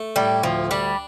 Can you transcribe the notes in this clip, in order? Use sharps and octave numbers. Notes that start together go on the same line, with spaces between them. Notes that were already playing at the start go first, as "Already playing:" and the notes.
Already playing: A3
A2 G3
D2 F3
G3 D4